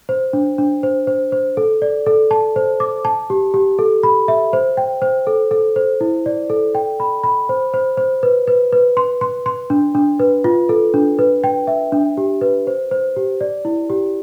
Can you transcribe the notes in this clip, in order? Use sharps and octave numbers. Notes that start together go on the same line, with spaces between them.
C5
D4
D4
C5
C5
C5
A4
D5
A4
A5
C5
D6
A5
G4
G4
A4
B5
E5
C5
G5
C5
A4
A4
C5
E4
D5
A4
G5
B5
B5
C5
C5
C5
B4
B4
B4
C6
C6
C6
D4
D4
B4
F4
A4
D4
B4
G5
E5
D4
G4
B4
C5
C5
G4
D5
E4
G4